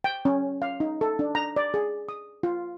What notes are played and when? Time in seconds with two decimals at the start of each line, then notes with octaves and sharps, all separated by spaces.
0.04 G5
0.25 C#4
0.62 F5
0.80 D#4
1.01 A4
1.19 D4
1.35 A#5
1.56 D5
1.74 G#4
2.09 D#6
2.43 F4